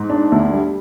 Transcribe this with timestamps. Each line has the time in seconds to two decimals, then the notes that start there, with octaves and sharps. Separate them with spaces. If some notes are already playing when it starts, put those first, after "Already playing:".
Already playing: G#2
0.10 D4
0.32 D2
0.53 G3